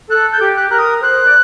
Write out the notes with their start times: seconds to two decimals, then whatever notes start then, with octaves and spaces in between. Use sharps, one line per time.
0.10 A4 F#6
0.33 G6
0.40 G4
0.57 F#6
0.70 A#4 F#6
0.79 D#6
1.02 C5 F#6
1.27 D5